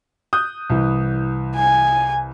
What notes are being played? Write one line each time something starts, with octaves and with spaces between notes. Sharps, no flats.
D#6 F#6 G6
C2 E3
G#5